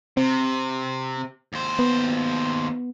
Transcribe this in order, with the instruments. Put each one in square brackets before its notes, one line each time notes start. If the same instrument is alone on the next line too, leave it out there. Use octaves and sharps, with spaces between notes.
[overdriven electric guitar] C3 [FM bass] C4
[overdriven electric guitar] D#2 C5
[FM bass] B3